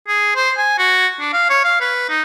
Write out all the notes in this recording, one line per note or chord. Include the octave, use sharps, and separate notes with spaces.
G#4
C5
G#5
F#4
D4
F5
C#5
F5
B4
D#4